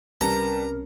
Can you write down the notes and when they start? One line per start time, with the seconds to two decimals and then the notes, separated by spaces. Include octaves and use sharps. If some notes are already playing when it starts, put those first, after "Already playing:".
0.21 C2 C3 G3 C#4 A#4 B4 A5 A#5